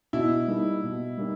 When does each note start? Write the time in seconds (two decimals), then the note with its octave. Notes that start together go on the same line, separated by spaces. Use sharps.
0.13 B2 E4
0.48 G3 A#3 D#4
0.83 B2
1.18 G3 A#3 D#4